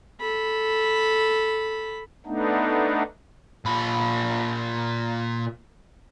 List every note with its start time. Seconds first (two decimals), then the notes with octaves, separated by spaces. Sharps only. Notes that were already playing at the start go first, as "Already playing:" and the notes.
0.21 A4 B5
2.26 A3 B3 D4 D#4
3.65 A#2 B5